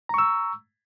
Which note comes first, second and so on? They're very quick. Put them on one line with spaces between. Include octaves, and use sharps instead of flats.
A#5 C#6 E6